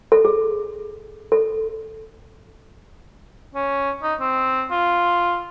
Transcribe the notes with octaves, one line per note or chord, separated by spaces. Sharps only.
A4
G#4
A4
C#4
D#4
C4
F4